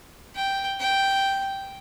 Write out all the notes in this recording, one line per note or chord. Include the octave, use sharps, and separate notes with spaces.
G5
G5